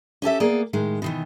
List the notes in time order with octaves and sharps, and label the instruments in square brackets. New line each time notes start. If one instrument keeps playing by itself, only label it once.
[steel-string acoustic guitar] C#4 G4 A4 E5
A#3 B3 G#4 D5
A2 D#3 G#3
B2 D#3 E3